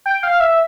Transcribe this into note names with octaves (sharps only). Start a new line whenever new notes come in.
G5
F5
E5